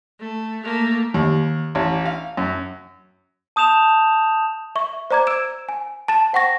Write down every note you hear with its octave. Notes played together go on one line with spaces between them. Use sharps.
A3
A3 A#3
D#2
A1
F5
F#2
A5 D#6 G6 E7 F7
E5 C#6
C5 D5 A#5 D6 G#6
E6 G#6 D7 E7
G#5
A5 A6 E7
C5 F#5 G5 C#6 A#6